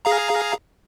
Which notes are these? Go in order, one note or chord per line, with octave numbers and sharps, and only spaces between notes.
G#4 F5 A#5